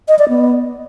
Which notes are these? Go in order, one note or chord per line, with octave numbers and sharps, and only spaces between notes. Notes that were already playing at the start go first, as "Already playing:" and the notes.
D#5
D5
B3